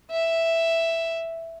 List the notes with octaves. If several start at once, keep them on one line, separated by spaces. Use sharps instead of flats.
E5